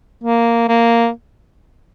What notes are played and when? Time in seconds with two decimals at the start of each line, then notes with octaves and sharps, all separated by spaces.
0.24 A#3
0.68 A#3